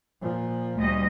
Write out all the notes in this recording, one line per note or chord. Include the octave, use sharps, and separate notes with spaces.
A#2 F3
D2 G3 D#5